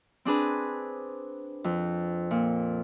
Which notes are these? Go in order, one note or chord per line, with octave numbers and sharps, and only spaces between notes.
C4 D4 G#4 B4
F2
A#2